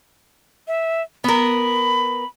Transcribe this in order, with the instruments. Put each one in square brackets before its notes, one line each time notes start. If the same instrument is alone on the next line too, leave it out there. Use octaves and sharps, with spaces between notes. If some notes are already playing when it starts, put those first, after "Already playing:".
[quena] E5
[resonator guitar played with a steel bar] B3 A#4 [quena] B5